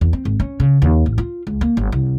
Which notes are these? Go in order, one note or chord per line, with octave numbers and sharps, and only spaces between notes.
E2
C4
G#1
C#4
C#3
D#2
A1
F4
C#2
A#3
G1
C2